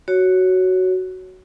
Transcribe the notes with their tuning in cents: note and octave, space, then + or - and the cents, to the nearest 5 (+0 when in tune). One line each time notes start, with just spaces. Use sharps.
F#4 +10 C#5 +0